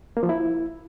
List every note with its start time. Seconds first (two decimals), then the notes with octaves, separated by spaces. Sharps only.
0.17 A#3
0.23 F3
0.29 E4